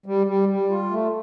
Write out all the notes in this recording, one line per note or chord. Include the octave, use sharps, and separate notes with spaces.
G3
G3
G3
F4
A3